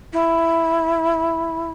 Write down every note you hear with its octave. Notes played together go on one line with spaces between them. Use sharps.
E4